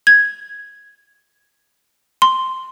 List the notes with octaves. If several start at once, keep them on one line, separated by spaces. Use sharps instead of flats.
G#6
C6